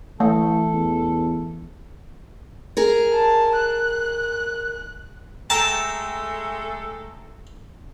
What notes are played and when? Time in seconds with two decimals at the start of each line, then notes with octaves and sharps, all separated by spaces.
0.20 E3 A3 A4
0.73 E2
2.77 G#4 A#4
3.13 A5
3.56 F#6
5.50 G#3 A3 A4 G5 A5 A#5 E6